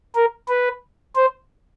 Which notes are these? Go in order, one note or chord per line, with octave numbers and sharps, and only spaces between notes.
A#4
B4
C5